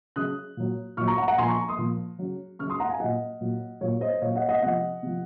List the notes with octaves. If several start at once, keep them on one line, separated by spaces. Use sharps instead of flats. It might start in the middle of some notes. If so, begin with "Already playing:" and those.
C#3 F#3 D#6 F#6
A#2 F#3
A#2 F#3 C#6 F6
A#5 C#6
F#5 A#5
F#5 A#5
A#2 F3 G#5 C6
A#5 C#6
C6 D#6
A#2 F3
C#3 F#3
C#3 F#3 C#6 F6
C6 D#6
F#5 A#5
F5 G#5
A#2 F#3 D#5 F#5
A#2 F#3
A#2 F#3 C#5
C5 D#5
A#2 F#3 C#5 F5
D#5 F#5
D#5 F#5
C3 F3 D#5 F#5
C3 F3